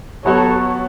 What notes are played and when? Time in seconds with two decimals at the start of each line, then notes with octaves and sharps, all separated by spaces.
0.25 F#3 B3 F#4 A4 C#5